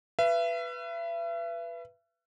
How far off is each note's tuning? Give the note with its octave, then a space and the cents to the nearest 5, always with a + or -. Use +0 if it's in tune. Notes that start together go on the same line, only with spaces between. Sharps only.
B4 +0 E5 +40